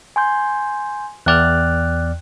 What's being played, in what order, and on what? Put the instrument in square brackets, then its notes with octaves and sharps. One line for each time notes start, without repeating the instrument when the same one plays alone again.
[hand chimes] G#5 C6 G6
[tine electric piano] E2 D5 F6 [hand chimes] G5 F#6